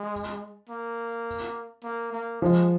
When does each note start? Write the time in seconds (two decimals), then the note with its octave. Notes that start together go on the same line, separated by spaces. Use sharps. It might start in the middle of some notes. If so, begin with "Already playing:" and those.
Already playing: G#3
0.70 A#3
1.84 A#3
2.13 A#3
2.42 F3 G#3